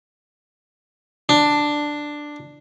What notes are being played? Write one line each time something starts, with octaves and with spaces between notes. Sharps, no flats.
D4